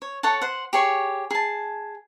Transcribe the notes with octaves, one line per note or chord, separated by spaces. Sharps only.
C#5
A4 C#5 F#5 A5
C5 F#5
G4 G#4 C#5 C#6
G#4 A5